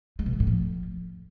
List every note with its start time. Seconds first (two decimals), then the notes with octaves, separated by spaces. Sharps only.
0.19 G#3
0.26 B2
0.33 F3
0.40 A2
0.47 F3